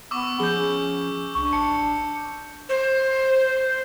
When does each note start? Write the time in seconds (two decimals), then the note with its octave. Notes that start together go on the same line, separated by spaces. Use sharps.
0.11 B3 C#6 D6 E6
0.40 F3 C#4 G#4 G6 G7
1.35 C2 D4 C#6
1.53 A1 A5 C#7
2.69 C5